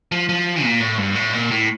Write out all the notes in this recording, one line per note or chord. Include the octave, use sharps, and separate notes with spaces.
F3
F3
A#2
A2
G2
A2
A#2
A2